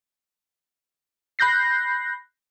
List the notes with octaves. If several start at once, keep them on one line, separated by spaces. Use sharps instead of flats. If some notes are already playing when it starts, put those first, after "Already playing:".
B5 F#6 G6 A#6 C7